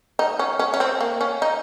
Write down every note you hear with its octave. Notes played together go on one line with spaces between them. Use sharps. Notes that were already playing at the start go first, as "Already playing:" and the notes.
D#4
C#4
C#4
C#4
C4
A#3
C#4
D#4